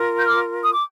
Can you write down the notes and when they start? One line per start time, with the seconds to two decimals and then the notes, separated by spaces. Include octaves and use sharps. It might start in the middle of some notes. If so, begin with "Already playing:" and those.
Already playing: F4 A#4
0.19 G6
0.27 D6 F6
0.64 D#6
0.73 D6